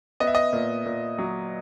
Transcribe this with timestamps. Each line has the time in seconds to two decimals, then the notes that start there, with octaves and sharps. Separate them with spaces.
0.20 B3 D#5
0.27 E5
0.35 D#5
0.53 A#2
0.86 A#2
1.18 F#3